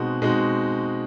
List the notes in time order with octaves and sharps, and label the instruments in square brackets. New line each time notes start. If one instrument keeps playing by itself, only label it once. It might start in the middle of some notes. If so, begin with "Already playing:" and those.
Already playing: [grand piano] B2 G#3 C4 D#4 F#4
B2 G#3 C4 D#4 F#4